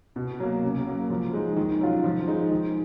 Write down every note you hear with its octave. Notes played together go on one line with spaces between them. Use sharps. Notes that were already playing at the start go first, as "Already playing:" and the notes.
B2
F#3 A#3
C#3
F#3 A#3
F3
G#3 D#4
D#3
F#3 C#4 F4
F3
G#3 D#4
D#3